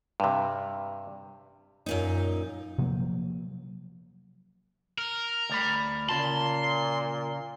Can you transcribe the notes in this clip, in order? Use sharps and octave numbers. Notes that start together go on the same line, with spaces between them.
G2 C3
F#2 A#2 D#4
C3 F3 F#3 A#3
A#4
D2 D5 B5
A#2 C#3 A5 C6